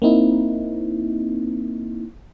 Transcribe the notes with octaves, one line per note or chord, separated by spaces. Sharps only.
A#3 C4 D#4 E4